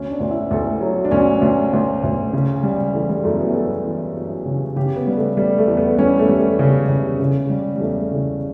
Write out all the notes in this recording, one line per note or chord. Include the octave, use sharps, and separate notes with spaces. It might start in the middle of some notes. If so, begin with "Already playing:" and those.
Already playing: D2 C#4
D4
D2
E4
D2 A4
F#3
D4
D2 C#4
D2
D2
D2
C#3
G3
E3 A3
G3
F#2 A3
B3
F#2 A4
E3
F#2
C#3
C#3 G4
B3
G3
A3
G3
A3
E2
B3
G3 C#4
A3
G3
C#3
C#3
C#3
G3
G3
E2 A3
C#3